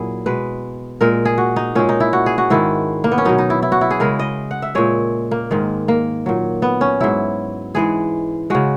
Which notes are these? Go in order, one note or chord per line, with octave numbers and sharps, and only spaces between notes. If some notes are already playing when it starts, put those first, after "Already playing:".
Already playing: A#2 F#3 E4 G#4
B2 G#3 B4
A#2 G#3 A#4
G#4
F#4
D#4
A#2 G#3 C#4
D#4
E4
F#4
G#4
F#4
G#2 D#3 G#3 E4
A#3
B3
C#4
B2 F#3 D#4
D#4
E4
E4
F#4
E4
G#4
C#3 G#3 A#4
D#5
F#5
E5
A#2 G#3 C#5
A#3
G#2 D#3 G#3
A#3
A#2 F#3
B3
C#4
G#2 F#3 E4
G#2 E3 G#3 G#4
C#3 G#3 F#4